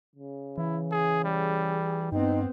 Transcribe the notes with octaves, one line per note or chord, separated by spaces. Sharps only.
C#3
E3 E4
G#4
G3 G#4
G2 B3 C4 D#4 G5